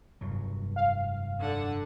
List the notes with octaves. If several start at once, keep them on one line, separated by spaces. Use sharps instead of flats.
F1 G2 F#3
F5
D3 F#5